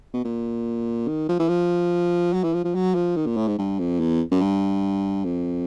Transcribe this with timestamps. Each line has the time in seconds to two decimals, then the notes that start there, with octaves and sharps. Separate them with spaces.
0.14 B2
0.25 A#2
1.08 D#3
1.29 F3
1.39 E3
1.49 F3
2.33 F#3
2.44 E3
2.54 F3
2.65 F3
2.75 F#3
2.95 F3
3.16 D#3
3.27 A#2
3.37 A2
3.48 G#2
3.59 G2
3.79 F2
4.00 E2
4.32 F#2
4.41 G2
5.24 F2